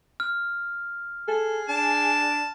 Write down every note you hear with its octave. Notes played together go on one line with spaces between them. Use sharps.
F6
G#4 A4
D4 A5